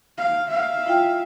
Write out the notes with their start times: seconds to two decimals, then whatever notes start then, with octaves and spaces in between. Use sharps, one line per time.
0.17 F5
0.47 E5 F5
0.86 E4 F4 G5